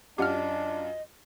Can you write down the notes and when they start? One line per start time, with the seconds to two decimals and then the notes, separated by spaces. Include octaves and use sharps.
0.18 F#2 D4 F4 G4 D#5 F#5 F6